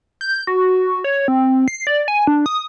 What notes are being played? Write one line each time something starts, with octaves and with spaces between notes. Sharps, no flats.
G6
F#4
C#5
C4
C7
D5
G#5
D4
D#6